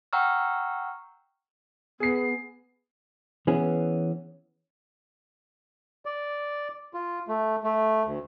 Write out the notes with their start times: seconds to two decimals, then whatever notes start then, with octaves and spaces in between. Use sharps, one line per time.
0.13 F#5 G5 A#5 C#6 E6 F6
2.00 B3 G#4 C7
3.47 E3 B3 C#4 G#4
6.05 D5
6.94 F4
7.28 A3
7.64 A3
8.05 D2